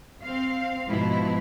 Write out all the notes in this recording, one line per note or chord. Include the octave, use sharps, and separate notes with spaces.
C4 F5
G#2 B2 F3 E4